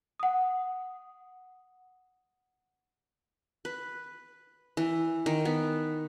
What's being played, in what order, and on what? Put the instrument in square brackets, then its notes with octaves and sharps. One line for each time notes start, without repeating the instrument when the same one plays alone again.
[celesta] F#5 D#6
[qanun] B4
E3
D#3
B3